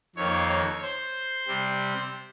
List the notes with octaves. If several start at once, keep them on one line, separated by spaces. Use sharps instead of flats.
F2 D#3 A#3 C#5
C#5
C5
C3 G3 C4